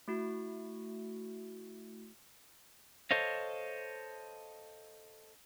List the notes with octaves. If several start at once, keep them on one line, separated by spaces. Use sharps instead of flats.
A3 E4 F#4
A4 C5 C#5 D#5 F5